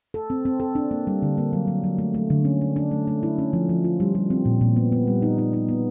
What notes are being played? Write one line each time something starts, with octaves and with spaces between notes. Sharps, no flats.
A4
C4
C4
A4
D4
A#3
G3
D3
A#3
F#3
F#3
F#3
A3
A3
D3
C#4
D4
D4
A3
A3
E4
C#4
F3
F3
F4
G3
G3
C4
A#2
A#2
B3
B3
G3
D#4
D#4
D#4
B3